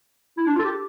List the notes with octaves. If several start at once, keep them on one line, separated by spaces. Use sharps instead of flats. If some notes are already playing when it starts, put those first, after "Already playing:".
E4
D4
F4
A4
G4